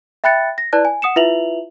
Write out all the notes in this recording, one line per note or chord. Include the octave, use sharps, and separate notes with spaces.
E5 G5 B5 F#6 A6 C#7
A#6
E4 B4 D5 A5 F#6
G#5
F#5 D#6 C#7 E7
E4 F4 B4 E5 F7 F#7